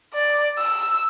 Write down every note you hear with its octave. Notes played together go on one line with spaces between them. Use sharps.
D5
E6